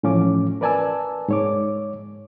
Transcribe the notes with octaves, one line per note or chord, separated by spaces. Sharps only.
A2 E3 F3 C#4 F4 D6
A#4 B4 D5 G#5 A5 E6
G#2 C#5 D6